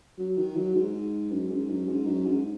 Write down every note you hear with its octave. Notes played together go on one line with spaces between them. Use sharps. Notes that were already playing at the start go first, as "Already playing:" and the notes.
F#3
D#3
F#3
G#2
F#2
G#2
F#2
G#2
F#2
G#2